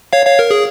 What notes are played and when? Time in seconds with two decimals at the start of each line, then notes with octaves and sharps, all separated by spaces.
0.13 C#5 F5
0.26 C#5 F5
0.39 A#4
0.51 G#4